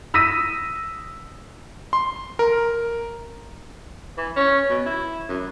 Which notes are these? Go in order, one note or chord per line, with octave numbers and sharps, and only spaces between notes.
D#6 E6 A#6 B6 D#7
C6
A#4
E3
C#4
B2
E4
F#2